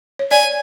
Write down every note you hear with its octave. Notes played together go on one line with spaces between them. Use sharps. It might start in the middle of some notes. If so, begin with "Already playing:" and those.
C#5
D5 G#5